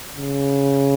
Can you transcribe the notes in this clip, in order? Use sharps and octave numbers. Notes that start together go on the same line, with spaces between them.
C#3